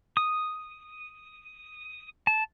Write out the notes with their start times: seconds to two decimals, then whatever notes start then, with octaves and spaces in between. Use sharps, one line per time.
0.17 D#6
2.27 A5